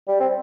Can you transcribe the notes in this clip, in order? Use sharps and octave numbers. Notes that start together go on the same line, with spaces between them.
G3
C4